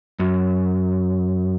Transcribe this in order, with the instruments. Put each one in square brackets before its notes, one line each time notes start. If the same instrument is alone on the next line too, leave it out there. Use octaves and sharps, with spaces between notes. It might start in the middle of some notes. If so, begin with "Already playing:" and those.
[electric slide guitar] F#2